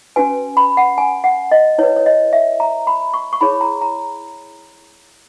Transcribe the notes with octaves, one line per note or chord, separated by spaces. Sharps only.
C#4 F#4 B4 G#5
B5
F#5
G#5
F#5
D#5
E4 B4 C#5
C#5
D#5
E5
A#5
B5
C#6
C#6
E4 G#4 C#5 B5
A#5
A#5